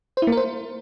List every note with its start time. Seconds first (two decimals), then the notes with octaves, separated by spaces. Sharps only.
0.17 C5
0.22 E4
0.27 A#3
0.32 A#4
0.37 C5